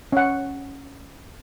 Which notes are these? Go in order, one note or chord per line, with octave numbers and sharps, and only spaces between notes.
C#4 F#5